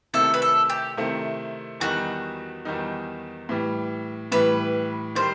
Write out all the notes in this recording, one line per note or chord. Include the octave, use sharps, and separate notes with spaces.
C3 D#3 A3 E4 A4
B4
A4
G4
C3 D#3 A3 E4
E2 D#3 G3 D#4 F#4
E2 D#3 G3 D#4
A2 E3 G3
A2 E3 G3 B4
D#3 G3 C5